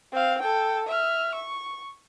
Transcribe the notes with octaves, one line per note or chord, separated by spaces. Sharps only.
C4 F5
A4 G5
E5 F6
C#6